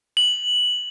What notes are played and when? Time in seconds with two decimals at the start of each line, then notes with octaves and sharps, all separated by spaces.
0.17 F#7